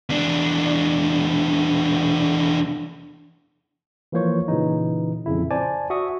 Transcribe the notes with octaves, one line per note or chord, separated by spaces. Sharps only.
E2 D4
E3 F3 A#3 C5 C#5 C#6
A#2 C#3 E3 D#4
F2 A#2 C#3 E4
C5 D5 G#5 A5
F#4 E5 C#6 D#6